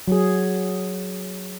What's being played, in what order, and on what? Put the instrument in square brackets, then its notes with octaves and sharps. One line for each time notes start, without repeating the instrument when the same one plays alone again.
[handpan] F#3 G#4